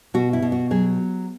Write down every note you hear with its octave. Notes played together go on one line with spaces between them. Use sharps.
B2 F#4
E4
B2
F#4
F#3 G#4